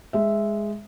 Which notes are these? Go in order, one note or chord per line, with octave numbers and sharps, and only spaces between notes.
G#3 E5